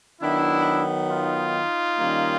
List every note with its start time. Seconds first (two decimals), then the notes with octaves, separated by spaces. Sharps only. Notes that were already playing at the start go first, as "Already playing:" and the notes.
0.22 D#3 F#3 B3 D4 E4
1.10 D#4 F4
1.99 D#3 G3 A#3 C#4